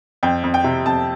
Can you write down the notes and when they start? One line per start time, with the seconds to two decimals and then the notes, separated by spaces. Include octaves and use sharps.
0.23 F2 G5
0.44 F2
0.54 G5
0.64 C3
0.86 F2 A5